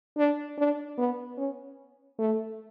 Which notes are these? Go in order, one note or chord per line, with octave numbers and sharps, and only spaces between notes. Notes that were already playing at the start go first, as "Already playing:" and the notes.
D4
D4
B3
C#4
A3